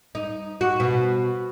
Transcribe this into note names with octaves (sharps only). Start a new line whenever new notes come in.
D#4
F#4
B2